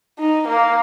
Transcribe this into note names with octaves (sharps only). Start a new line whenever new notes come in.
D#4
A#3